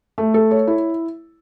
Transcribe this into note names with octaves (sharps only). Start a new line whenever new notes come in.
A3
A4
C#5
E4